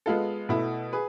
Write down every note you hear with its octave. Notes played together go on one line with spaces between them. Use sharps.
G#3 B3 F4 A4
B2 A3 E4
G#4 B4